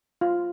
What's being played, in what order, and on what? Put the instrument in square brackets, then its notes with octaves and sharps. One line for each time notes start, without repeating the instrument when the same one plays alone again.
[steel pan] F4